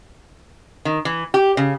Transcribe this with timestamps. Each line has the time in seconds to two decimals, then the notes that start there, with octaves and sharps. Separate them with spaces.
0.85 D#3
1.05 E3
1.34 G4
1.57 C#3